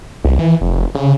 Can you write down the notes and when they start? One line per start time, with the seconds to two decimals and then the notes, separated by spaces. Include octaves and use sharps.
0.25 C2
0.39 E3
0.61 F1
0.95 C#3